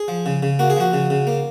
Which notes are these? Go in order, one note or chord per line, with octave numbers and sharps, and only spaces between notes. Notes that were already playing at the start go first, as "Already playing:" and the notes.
Already playing: G#4
F3
C#3
C#3
A#3 F#4
G#4
F3 F#4
C#3
C#3
A#3